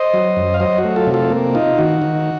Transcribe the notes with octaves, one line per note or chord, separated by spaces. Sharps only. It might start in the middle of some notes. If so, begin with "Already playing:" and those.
Already playing: C5 D#5
F#3
F#2
F5
F#3 C5 D#5
F#4
A3
F4 A4
C3
F4 A4
A#3
D#4 F4
D#3 F#4
D#3